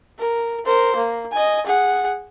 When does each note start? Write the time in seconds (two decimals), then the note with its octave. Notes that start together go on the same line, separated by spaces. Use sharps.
0.19 A#4
0.65 A#4 C5
0.96 A#3
1.32 D#5 G#5
1.66 G#4 F#5